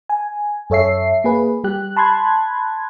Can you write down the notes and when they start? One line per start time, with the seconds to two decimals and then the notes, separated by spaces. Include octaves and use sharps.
0.09 G#5
0.70 F#2 A4 C#5 E5 C7
1.24 A#3 G#4 B4
1.64 G3 G4 F#6
1.96 A5 B5 C6 F#6 G#6